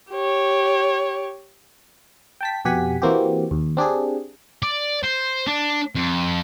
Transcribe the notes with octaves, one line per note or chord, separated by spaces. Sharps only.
G4 C#5
G5 A5 B6
F2 B2 G4 F#5 G#5 B6
E3 A#3 C4 F#4 G4
D#2
C4 D4 G4 G#4
D5
C5
D4
F2